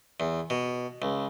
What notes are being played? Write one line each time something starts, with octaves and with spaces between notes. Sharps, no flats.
E2
B2
C#2